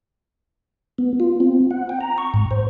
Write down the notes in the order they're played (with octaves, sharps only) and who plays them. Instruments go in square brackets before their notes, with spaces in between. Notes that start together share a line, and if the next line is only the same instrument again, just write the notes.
[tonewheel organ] B3
F4
C4
F#5
G5
A#5
C#6
G#2
C5